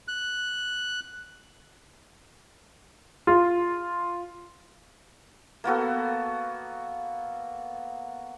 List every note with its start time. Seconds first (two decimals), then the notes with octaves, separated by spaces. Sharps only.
0.08 F#6
3.27 F4
5.64 A#3 B3 F#4 A4